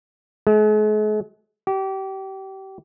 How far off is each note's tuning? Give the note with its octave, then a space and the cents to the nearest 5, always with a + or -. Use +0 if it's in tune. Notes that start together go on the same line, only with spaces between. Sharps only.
G#3 +45
G4 -30